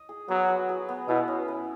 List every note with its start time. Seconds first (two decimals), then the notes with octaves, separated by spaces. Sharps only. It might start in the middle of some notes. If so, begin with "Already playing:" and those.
Already playing: D#5
0.09 G#4
0.28 F#3 B3
0.49 B4
0.69 G#4
0.89 B3
1.08 B2 E4
1.28 C#4
1.48 B4